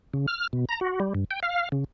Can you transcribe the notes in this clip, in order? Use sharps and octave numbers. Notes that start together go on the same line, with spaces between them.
C#3
F6
B2
A#5
F#4
G3
G2
G5
F5
C#3